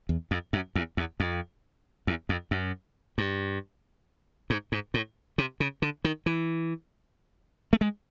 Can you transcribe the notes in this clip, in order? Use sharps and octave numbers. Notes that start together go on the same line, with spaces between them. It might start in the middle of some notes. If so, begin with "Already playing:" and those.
E2
F2
F#2
E2
E2
F2
E2
F2
F#2
G2
G#2
G#2
A2
C3
C#3
D3
D#3
E3
A3
G#3